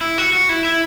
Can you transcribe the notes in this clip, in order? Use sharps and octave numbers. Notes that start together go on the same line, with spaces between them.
E4
F#4
F#4
E4
E4